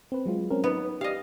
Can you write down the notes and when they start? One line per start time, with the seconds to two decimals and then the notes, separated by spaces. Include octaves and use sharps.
0.12 C4 B4
0.26 F#3 G#3 F4
0.50 C4 C#4 A#4
0.64 B3 D#4
1.01 G4 D5 D#5 F5